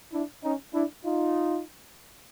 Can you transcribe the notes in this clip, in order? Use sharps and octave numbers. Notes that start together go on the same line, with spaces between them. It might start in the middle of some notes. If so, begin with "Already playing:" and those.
D4 E4
C#4 D#4
D4 E4
D#4 F4